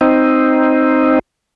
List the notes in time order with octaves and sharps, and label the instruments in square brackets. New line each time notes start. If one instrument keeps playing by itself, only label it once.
[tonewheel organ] C4 D#4